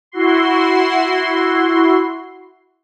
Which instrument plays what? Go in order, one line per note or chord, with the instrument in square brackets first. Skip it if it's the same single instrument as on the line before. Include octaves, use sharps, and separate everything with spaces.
[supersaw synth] E4 F#4 C6